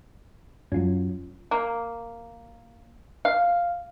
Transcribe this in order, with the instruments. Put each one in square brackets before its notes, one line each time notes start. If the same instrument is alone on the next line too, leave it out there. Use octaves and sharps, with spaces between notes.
[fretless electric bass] F#2 F#3 [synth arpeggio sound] C#4 F4
[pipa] A#3
F5